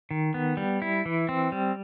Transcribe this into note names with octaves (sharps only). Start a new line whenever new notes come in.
D#3
B3
G3
E4
E3
C4
G3